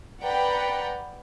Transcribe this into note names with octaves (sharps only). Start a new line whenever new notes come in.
B4 D5 F#5 G5 A#5